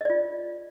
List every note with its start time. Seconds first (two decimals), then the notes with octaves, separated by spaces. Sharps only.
0.01 D#5
0.05 D5
0.10 F4